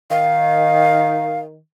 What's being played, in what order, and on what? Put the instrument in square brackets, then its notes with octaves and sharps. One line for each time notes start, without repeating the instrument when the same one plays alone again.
[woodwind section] D#3 [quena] F5